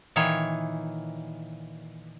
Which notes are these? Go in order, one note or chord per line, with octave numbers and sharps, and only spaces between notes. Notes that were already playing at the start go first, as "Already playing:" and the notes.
A#2 D#3 E3 C#5